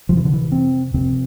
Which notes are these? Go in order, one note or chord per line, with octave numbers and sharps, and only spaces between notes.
F2 C3 F3
E3
D3
E3
C4
F2 C3 C4